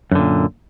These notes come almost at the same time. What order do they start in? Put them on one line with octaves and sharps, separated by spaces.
F#2 D3 A#2